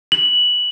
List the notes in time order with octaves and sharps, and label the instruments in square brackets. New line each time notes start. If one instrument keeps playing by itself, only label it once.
[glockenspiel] F#7